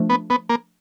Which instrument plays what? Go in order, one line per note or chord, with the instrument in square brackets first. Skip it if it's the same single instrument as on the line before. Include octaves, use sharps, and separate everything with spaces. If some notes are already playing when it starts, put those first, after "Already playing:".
Already playing: [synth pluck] F3 A3 D4
[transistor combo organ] B3
B3
A#3